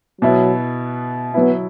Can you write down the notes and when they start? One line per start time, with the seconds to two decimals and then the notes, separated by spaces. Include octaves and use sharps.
0.21 B2 F#3 B3 E4
1.34 F#3 B3 E4